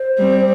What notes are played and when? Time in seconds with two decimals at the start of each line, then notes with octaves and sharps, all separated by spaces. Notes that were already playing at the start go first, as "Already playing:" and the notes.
Already playing: C5
0.19 G3 C4